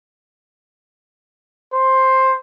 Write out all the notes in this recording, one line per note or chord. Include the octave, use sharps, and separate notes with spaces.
C5